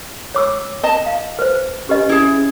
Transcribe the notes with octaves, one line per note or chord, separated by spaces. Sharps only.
C#5 D6 E6
D#5 A5
F5
B4 C5
C#4 G4 B4 D#5
E4 G#4